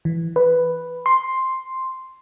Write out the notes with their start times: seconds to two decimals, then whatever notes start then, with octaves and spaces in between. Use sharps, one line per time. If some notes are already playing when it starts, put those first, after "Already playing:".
0.05 E3
0.36 B4
1.06 C6